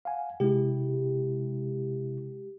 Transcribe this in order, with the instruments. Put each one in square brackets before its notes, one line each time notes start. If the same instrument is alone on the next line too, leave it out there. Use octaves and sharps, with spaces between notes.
[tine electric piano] F5 F#5 G#5
[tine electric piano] C3 E4 [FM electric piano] G#3 G4